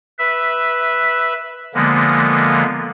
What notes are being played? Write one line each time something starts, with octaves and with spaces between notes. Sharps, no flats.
B4 E5
D3 F3 G#3 A#3 B3